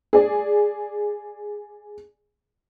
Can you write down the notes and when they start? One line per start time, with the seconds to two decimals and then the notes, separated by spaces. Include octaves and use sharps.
0.13 G#4 D5